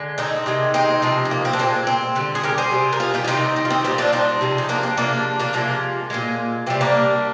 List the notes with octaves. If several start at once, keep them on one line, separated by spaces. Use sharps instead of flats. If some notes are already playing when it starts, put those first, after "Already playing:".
Already playing: D3 G#3
C4 D#4
C3 D#3 G#3
C4 D#4
C3 F3 G#3
C4
A#3
C4
D4
A#2 G#3 C4
C4
D3 G3
G#4
G4 A#4
G#4 C5
C3 G3
A#4
F4 G#4
D#4 G4
F4
C3 D#3 G3 C4 D#4
C4
F4
C4 D#4
A#2 G3 C4 D#4
D4 F4
C4 D#4
C3 F3 G#3
D#4
A#3 D4
C4
C3 F3 G#3 A#3 D4
A#3 D4
C3 F3 G#3 A#3
A#2 F3 G#3
C3 G3 C4
A#3 D4